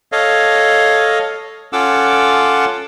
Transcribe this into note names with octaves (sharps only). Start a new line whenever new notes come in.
A4 C#5 D#5 F5
C#4 F4 A4 F#5 D6 E6